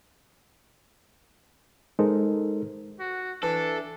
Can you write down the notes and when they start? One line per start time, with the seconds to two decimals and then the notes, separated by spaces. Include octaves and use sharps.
1.99 G#3 D#4 A4 A#4 C5
3.00 F#4
3.43 E3 D4 A4